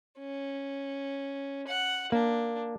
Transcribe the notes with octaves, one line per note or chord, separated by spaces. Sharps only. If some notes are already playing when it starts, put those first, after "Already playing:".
C#4
F#5
A#3 D4